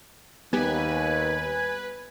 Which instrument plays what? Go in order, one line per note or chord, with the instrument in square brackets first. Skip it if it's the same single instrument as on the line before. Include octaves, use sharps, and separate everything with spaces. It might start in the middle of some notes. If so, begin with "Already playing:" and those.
[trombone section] D#2 [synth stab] G3 B3 [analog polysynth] B4 [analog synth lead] G#5